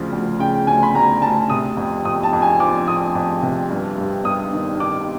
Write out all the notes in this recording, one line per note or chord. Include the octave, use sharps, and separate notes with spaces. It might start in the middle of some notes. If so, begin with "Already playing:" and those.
Already playing: D2 C#3 F3
D2
C#3 G5
D2 G#5
B5
D2 A#5
D2 A5
C3 D#6
F2
F2 D#6
A5
F2
G#5
F3 D6
F2 D#6
F2
C3
G2
G2
G2 D#6
D#3
D#3 D6